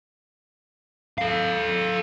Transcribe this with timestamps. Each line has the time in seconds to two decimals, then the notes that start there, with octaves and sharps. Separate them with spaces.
1.18 A4 F5